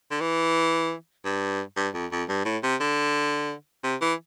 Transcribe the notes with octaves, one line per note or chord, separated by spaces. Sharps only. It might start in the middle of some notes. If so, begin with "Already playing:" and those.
D3
E3
G2
G2
F2
F2
G2
A2
C3
D3
C3
E3